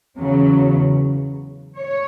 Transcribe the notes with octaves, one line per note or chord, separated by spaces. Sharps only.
E2 C#3 F#3
C#5